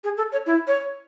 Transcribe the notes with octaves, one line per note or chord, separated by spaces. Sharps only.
G#4
A4
C#5
E4
C#5